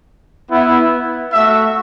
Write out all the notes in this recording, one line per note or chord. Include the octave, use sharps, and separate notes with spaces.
B3 E4
A3 F#4 E5